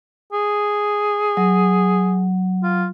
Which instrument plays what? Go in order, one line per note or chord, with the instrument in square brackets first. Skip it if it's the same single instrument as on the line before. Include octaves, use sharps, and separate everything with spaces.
[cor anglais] G#4
[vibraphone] F#3
[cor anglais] F4